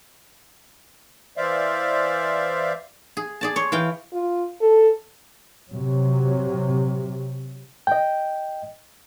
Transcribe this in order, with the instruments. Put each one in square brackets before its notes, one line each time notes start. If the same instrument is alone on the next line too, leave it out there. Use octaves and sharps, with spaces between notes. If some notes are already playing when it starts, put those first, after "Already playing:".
[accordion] E3 C5 D5 E5 F5
[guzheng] G#4
G#4 D5 A5
C#5 C6
E3 F5 G5
[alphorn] F4
A4
[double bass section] C3 F#3
[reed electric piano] D#5 G5